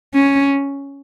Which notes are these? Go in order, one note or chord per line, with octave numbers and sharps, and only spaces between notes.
C#4